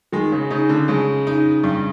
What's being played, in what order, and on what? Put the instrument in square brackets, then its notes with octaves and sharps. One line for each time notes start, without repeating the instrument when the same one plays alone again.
[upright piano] D#3 [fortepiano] G#3
[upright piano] C#3
[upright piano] C#3 [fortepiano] D#4
[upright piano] D3
[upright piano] C#3 [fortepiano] G#3
[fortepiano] D#4
G2